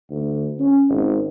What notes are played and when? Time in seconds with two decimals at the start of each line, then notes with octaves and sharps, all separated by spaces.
0.11 D2
0.60 C#4
0.89 G#1